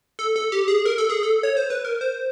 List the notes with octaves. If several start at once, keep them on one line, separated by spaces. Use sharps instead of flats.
A4
A4
G4
G#4
A#4
A4
G#4
A4
C#5
C5
B4
A#4
C5